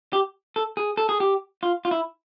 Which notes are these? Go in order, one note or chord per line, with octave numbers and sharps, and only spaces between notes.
G4
A4
G#4
A4
G#4
G4
F4
F4
E4